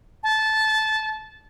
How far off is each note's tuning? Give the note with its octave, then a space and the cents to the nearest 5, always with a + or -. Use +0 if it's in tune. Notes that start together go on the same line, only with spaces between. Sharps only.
A5 -15